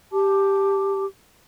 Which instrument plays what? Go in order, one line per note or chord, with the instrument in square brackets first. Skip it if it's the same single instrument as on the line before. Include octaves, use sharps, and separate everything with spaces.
[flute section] G4 A5 D6